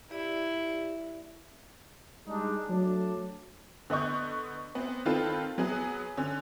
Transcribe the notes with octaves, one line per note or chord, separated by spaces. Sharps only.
E4 G4 D5
G3 G#3 D4 D#4
F#3 A3 D4
D3 B3 D#5 C#6 G6
B3 C4
D#3 C4 F4 A4 B4
F#3 B3 G#4
D3 C#4